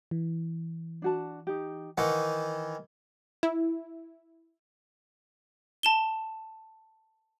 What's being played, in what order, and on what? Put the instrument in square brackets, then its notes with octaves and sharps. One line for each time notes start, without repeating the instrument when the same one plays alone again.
[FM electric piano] E3
[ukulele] D4 F#4 A5
D#4 G4
[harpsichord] D#3 E3 [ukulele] F#5
[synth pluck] E4
[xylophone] A5 E7 G7